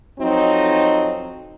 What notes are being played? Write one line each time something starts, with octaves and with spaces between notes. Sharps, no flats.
F2 F#3 C4 D#4